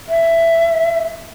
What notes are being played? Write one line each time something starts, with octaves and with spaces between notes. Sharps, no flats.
E5